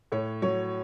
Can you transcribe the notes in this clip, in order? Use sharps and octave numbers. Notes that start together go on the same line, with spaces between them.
A2 C#5
F#3 C#5